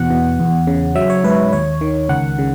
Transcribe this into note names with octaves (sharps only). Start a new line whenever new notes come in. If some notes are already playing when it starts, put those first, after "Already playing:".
Already playing: E2 B2 F#5
B2
E2
C#3
F#3 E5
C#5
G#2 B4
D#2 C#5
D#3
C#2 F#5
C#3